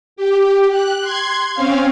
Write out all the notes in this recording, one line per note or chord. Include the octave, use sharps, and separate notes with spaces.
G4
F#6
C6 G#6
C4 C#4 F5